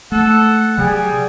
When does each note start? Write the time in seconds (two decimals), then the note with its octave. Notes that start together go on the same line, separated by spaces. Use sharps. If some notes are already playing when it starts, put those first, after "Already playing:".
0.12 A3 A4 F#5
0.78 C3 F#3 G3 G#4